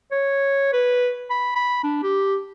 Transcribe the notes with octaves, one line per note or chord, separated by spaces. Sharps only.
C#5
B4
B5
B5
D4
G4